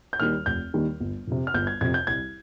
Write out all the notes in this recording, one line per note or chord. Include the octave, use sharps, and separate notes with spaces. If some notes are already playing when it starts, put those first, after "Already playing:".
G6
D#2 D#3 G3 F6
F1 G6
D#2 D#3 G3
G1
F2 C3
F6
G1 G6
G#6
F2 C3 G#6
G6
C2 G#6